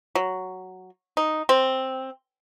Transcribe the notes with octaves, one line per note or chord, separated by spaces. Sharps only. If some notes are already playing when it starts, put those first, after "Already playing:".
F#3
D#4
C4